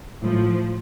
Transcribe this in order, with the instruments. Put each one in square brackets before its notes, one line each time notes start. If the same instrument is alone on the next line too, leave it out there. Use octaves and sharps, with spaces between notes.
[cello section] A2 F3